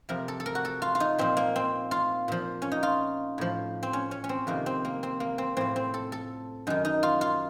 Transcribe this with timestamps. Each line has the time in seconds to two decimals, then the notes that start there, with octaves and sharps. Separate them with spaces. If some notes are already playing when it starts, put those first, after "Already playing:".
0.09 F2 C3 F3 A#4
0.28 A4
0.40 A4
0.46 A#4
0.55 F#4
0.65 A4
0.82 F4
0.95 F4
1.00 D#4
1.18 A#2 F3 C4
1.37 A#3
1.56 C4
1.91 F4
2.28 A#2 F3
2.62 C#4
2.72 D#4
2.83 F4
3.38 A2 F3
3.83 C4
3.93 C#4
4.11 C#4
4.24 C#4
4.29 C4
4.47 F2 C3 D#3 A#3
4.66 C4
4.85 A#3
5.03 C4
5.20 A#3
5.38 C4
5.57 A2 F3 C4
5.76 C4
5.94 A4
6.12 A4
6.67 F#2 D#3 D#4
6.85 D#4
7.03 F4
7.21 F4